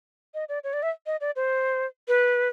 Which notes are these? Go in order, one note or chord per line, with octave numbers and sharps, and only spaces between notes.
D#5
D5
C#5
D5
E5
D#5
D5
C5
B4